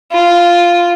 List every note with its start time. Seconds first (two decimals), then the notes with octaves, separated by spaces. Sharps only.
0.12 F4